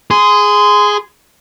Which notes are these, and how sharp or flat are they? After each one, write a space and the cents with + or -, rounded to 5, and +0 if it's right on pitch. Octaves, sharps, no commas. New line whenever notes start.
G#4 +0 C6 -25